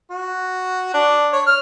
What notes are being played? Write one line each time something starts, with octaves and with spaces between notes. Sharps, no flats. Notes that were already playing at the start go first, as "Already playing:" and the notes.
F#4
D4
C#5
F6